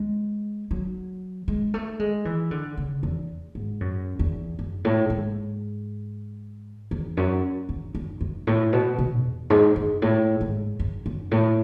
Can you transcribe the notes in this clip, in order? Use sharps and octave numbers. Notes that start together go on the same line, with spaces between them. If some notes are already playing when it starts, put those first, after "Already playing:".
Already playing: G#3
F#3
G#3
A3
G#3
E3
D3
C#3
E2
G#2
F#2
E2
F#2
A2
G#2
E2
F#2
E2
F#2
F#2
A2
B2
B2
E2
G#2
F#2
A2
G#2
F#2
F#2
A2